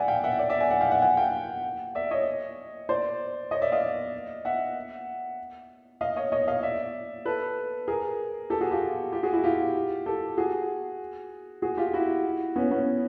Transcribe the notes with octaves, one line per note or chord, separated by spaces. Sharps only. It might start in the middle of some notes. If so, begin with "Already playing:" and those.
Already playing: D5 E5 F#5 G#5
F5 G5
E5 F#5
D5 E5
D5 E5
F#5 G#5
F#5 G#5
F5 G5
E5 F#5
F#5 G#5
F5 G5
D5 E5
C#5 D#5
C5 D5
C#5 D#5
D5 E5
D#5 F5
E5 F#5
D#5 F5
C#5 D#5
C#5 D#5
D#5 F5
D5 E5
A4 B4
G#4 A#4
G4 A4
F#4 G#4
F4 G4
F4 G4
F#4 G#4
E4 F#4
F4 G4
G4 A4
F#4 G#4
F#4 G#4
F4 G4
E4 F#4
B3 C#4
B3 C#4